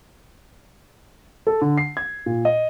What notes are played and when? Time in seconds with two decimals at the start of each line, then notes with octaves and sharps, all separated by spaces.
1.47 A4
1.62 D3
1.78 C7
1.97 G#6
2.26 A#2
2.45 D#5